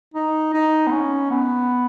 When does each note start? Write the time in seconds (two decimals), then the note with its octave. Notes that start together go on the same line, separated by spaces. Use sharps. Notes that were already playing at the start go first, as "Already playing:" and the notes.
0.14 D#4
0.53 D#4
0.87 B3
0.92 C#4
1.31 B3